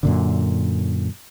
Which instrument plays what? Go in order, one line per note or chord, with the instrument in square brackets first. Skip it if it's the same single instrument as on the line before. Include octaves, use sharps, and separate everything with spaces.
[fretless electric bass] F#2 A#2 D3